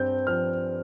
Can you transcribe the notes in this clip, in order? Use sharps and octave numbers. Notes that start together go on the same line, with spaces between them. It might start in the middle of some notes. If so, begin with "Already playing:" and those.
Already playing: G2 C4 G6
F3 F6